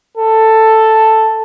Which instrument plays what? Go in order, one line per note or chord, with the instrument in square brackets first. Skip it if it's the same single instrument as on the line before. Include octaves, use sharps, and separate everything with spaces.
[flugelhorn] A4